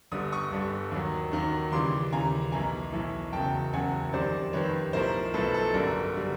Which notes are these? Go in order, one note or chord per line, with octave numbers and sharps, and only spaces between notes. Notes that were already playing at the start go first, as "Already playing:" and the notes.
G1 G2 D3 G3 D#6
C#6 D#6
G1 G2 D3 G3
D#2 D#3 F#3
D#2 D#3 F#3
D#2 C#3 E3 G3 C6 D6
D#2 C#3 E3 G3 G#5 A#5
B1 A2 E3 G#5 A#5
B1 A2 E3
F#1 E2 C#3 F#3 G5 A5
F#1 E2 C#3 F#3 F#5 G#5
F2 C3 D#3 G3 C5 D5
F2 C3 D#3 G3 B4 C#5
B1 A2 F3 A#4 C5
B1 A2 F3 A4 B4
A4
G1 F#2 D3 G3 A#4
D3 G3